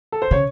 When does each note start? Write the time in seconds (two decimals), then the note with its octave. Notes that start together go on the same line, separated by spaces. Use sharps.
0.12 A4
0.22 C5
0.31 C#3 C#5